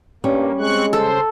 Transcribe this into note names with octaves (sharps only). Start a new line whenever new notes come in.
G2 G3 A#3 C#4
G#3 C4 C#6 F#6
C#3 A4 C5